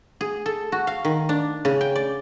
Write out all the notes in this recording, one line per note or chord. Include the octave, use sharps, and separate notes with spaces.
G#4
A4
F#4
F5
D#3
D4
C#3
G5
D5